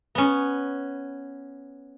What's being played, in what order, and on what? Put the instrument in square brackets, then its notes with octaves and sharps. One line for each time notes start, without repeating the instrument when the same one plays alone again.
[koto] B3 C#4